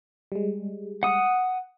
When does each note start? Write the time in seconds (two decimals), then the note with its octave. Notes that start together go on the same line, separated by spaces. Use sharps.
0.32 G3 G#3
1.03 F#5 D#6